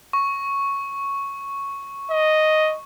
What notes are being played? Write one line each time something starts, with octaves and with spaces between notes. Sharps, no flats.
C#6
D#5